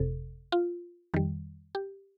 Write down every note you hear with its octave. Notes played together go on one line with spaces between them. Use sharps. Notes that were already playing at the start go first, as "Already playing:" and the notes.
Already playing: G1 F2 C3 A4
F4
F2 D#3 G3
G4